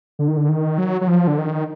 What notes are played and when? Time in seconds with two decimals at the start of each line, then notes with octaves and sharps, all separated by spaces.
0.19 D3
0.28 D#3
0.37 D3
0.49 D#3
0.78 F#3
1.01 F#3
1.08 F3
1.27 D3
1.38 D#3